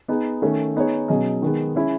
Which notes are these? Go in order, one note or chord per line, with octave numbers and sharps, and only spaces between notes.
B3 D#4 G#4
D#3 A3 C#4
B3 D#4 G#4 C#5
B2 F#3 C#4 G#4 D#5
D#3 G#3 B3
G#3 C#4 E4